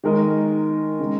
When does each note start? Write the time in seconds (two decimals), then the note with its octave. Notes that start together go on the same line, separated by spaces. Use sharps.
0.04 D#3 G#3 D#4 A#4 D#5
0.99 C#3 G#3